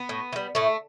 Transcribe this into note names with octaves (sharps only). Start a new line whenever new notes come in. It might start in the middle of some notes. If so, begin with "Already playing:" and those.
Already playing: B3
A2
E3
G3
A2 A3